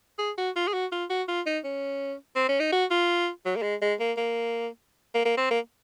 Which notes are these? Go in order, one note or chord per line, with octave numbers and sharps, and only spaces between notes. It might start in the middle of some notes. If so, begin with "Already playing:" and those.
G#4
F#4
F4
G#4
F#4
F4
F#4
F4
D#4
C#4
C4
C#4
D#4
F#4
F4
F#3
A#3
G#3
G#3
A#3
A#3
A#3
A#3
C4
A#3